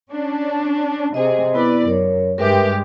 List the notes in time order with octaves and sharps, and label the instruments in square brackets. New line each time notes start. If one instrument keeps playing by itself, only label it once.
[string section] C#4 D4
[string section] C3 G#4 [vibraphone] C5 D#5
[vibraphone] B3 E4 [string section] B4 D5
[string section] F#2 [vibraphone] A#4 C#5
[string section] G2 G#3 G4 [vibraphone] A#4 B4 E5